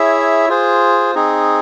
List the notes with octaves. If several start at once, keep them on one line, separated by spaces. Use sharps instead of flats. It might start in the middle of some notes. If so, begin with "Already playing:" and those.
Already playing: E4 G#4 C#5 E5
F4 G#4 C5
C4 D#4 G#4